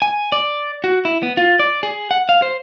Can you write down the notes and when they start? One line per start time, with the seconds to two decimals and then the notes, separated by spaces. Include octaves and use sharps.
0.02 G#5
0.32 D5
0.84 F#4
1.05 E4
1.23 B3
1.37 F4
1.59 D5
1.83 G#4
2.11 F#5
2.29 F5
2.42 C5